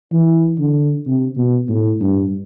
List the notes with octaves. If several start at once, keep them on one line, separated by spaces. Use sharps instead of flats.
E3
D3
C3
B2
A2
G2